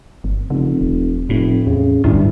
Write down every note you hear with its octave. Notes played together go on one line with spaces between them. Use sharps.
G1
F1 C#3
D#1
F1 A2
E2 C#3
D1 G1 G2 E4